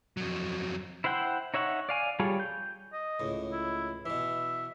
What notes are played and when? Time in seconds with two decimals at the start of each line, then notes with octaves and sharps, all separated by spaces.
0.17 F2 F#3
1.04 E4 C5 E5 F#5 G5
1.54 D#4 C#5 E5 F#5 C#6
1.89 D5 F5 G#5
2.20 G3 F4 G#4 A4 C#5
2.40 G6
2.93 D#5
3.20 C#2 A2
3.52 E4
4.06 B2 E3 E5